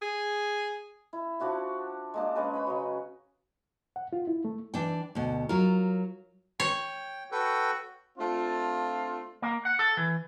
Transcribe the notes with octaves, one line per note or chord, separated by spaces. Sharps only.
G#4
E4
F3 D4 F#4 E5
G#3 A#3 D4
G#3 C#4 B4 D#5
B4 D#5 B5
C#3 F#3
F#5
F4
E4
A3
E3 D4 G5
D2 B2
F#3 F4 A#4
C#5 G5
F#4 A4 B4 G5
A3 C4 D4 F4
A#3
F#5
A4
E3